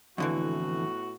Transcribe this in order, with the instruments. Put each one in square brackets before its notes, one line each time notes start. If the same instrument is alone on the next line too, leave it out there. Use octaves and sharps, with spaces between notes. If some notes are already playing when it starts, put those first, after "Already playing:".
[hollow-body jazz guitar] F2 D3 E3 [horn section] A2 B3 F#4